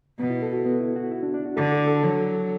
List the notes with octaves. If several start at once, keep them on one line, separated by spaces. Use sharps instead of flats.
B2 B3
E4
A4
F#4
B3
E4
F#4
E4
D4
D4
F#4
D3 A4
A4
A4
F#3